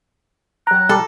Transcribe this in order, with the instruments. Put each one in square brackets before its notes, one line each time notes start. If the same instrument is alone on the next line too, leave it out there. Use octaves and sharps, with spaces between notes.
[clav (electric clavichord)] F#3 G5 [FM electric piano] A#5 [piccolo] F#6
[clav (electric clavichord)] G3 [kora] A4